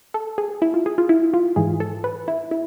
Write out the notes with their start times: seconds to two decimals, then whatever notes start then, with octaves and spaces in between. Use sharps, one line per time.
0.14 A4
0.38 G#4
0.62 E4
0.74 F4
0.86 G#4
0.98 F4
1.09 E4
1.34 F4
1.56 G#2 E3 G#4
1.80 A4
2.04 B4
2.28 E4
2.51 E4